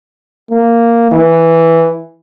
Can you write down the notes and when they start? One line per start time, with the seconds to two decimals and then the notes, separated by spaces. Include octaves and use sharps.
0.51 A#3
1.11 E3